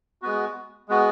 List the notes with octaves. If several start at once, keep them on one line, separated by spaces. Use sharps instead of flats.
G#3 B3 F#4
G#3 B3 F#4